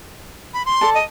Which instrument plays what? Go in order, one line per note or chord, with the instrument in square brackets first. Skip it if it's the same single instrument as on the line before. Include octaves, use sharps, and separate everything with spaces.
[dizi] B5
C6
[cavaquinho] A4 D5 A5
[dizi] D#5